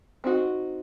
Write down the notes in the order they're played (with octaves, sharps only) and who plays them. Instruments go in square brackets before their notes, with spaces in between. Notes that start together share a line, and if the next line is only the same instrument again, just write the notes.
[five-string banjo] C4 D#4 F#4